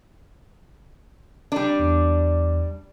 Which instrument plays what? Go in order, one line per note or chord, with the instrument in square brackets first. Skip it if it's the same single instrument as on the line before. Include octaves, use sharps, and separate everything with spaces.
[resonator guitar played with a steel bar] G3 D4
[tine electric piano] E2